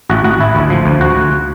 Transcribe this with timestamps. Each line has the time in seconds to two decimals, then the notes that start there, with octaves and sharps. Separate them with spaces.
0.09 A1 F#4
0.24 A1 F#4
0.40 A1 E4
0.55 D2
0.70 F3
0.86 D2
1.01 D2 F#4
1.16 D2